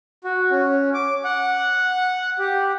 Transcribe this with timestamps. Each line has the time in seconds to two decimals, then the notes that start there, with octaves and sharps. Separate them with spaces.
0.24 F#4
0.51 C#4
0.94 D6
1.24 F#5
2.39 G4